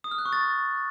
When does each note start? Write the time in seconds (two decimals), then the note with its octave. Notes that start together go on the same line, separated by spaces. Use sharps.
0.04 D#6
0.11 F6
0.18 F#6
0.25 C#6
0.33 A6